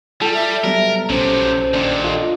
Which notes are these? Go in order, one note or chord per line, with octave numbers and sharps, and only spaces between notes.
G3 F4 A4
E5
F#3 G3 B3 A#4
A#1 C3 F#3 C#4 C5
D#2 A#2 D4
F4 A4 D#5